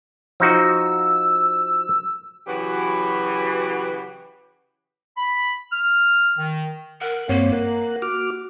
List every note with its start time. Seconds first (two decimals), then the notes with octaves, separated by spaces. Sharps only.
0.40 F3 D#4 F#4 E6
2.47 C#3 E3 F#3 F#4 G4 B4
5.17 B5
5.73 F6
6.38 D#3
7.01 A#4 F#5
7.29 G2 A#3 C4 C#5
7.53 A#4 F#5
8.02 F#4 D6 F6